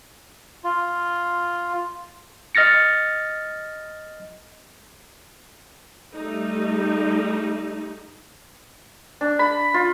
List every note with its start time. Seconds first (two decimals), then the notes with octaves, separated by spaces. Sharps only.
0.64 F4
2.55 D#5 F6 A6 A#6 C#7
6.16 G3 A3 D#4
9.21 D4
9.39 B5
9.74 F4